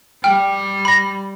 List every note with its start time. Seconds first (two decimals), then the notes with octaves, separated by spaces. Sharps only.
0.24 G3 G5 F6
0.85 B5 A#6